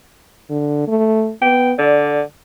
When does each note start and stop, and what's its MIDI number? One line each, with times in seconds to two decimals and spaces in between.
0.50 0.87 50
0.88 1.32 57
1.42 1.73 59
1.42 1.72 79
1.79 2.22 50
1.79 2.23 74